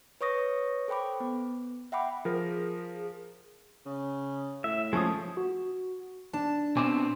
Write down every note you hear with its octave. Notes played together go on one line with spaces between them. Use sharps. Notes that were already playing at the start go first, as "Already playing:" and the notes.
B4 C#5 C#6 D#6 A#6
A4 C5 G5 B5 D6
B3
E5 F#5 G5 B5 D6
F3 G#4 A#4
C#3
A2 E5
F3 G#3 A3 C#4 D#6
F#4
D4 A5
B2 C4 C5 G#5 D6